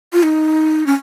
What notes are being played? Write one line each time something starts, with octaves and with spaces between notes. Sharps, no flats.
F4
D#4
C#4